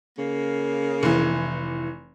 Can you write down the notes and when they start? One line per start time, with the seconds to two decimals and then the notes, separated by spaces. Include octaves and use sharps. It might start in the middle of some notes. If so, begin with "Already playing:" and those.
0.18 C#3 A#3
1.03 F1 E3